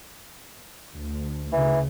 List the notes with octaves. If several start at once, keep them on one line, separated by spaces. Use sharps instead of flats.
D2
D2 C#3 E3